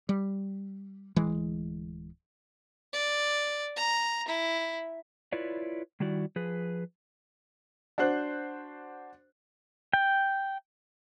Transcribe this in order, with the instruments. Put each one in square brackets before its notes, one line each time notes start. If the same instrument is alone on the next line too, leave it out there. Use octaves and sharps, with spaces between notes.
[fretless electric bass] G3
D1 E3 G#3
[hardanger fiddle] D5
A#5
E4
[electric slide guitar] E4 F4 B4 C#5 D5
D#3 G3 E4 F#4 D5
F3 G#4 B4
[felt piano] D4 F#4 C5 F#6
[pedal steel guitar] G5